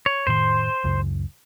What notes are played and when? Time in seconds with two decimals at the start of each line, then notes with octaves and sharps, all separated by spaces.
0.06 C#5
0.27 F1 A2 D#3 C5 C6
0.84 C#2 F#2 C#3